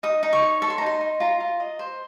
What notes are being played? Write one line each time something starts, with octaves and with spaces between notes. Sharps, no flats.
D#4 D#6
D#4
C#6
C#5
A4 C#6
C6
A#5
D#4
C6
D#4
F4 A#5
F4
D#5
C5